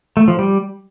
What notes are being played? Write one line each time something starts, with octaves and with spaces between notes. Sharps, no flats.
A3
F3
G3